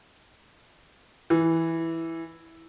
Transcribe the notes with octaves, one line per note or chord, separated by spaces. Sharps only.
E3